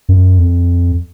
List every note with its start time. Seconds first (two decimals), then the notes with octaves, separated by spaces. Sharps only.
0.09 F#2
0.38 F2